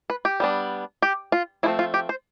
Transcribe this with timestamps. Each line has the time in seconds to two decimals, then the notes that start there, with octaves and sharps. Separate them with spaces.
0.10 B4
0.25 G4
0.40 G3 B3 D4
1.02 G4
1.32 F4
1.63 F3 A3 C4 E4
1.79 F4
1.94 G4
2.09 C5